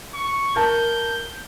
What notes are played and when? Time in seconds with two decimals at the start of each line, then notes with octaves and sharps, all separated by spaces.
0.14 C#6
0.56 A#4 A5 G6